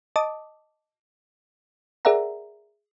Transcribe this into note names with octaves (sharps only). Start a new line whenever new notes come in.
D#5 A5 D6 D#6
G#4 A#4 D5 E5 F#5 A#5